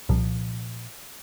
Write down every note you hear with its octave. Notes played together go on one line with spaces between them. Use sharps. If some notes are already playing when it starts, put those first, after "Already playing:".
C2 A#2 F3